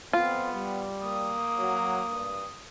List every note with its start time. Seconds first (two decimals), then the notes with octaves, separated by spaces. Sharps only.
0.13 F2 F3 B3 C4 F4
0.51 G3
1.04 A#3 D#6
1.56 F#3
2.07 G2